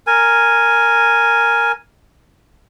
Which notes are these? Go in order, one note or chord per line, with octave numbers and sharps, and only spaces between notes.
A#4 G#5